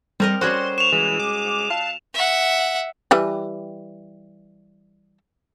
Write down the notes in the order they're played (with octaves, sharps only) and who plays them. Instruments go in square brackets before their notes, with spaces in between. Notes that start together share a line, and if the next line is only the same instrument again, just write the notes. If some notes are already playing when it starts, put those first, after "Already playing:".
[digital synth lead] G3 [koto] C4 A#4 D#5
[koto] G3 C#4 F#4 [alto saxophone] C5 [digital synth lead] C6
[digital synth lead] C#6 [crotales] E7 F7
[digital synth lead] E3 [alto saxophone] G#3
[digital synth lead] D6
[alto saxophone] F5 [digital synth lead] A5
[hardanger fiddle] E5 F#5
[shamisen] E3 G3 B4